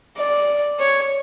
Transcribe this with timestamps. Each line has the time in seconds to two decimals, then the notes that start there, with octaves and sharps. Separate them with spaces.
0.18 D5
0.80 C#5